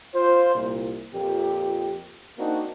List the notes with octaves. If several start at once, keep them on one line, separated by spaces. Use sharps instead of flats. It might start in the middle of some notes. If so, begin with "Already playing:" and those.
F4 C5
C2 A#2
F2 A#2 G4
A#3 C4 D4 D#4 F#4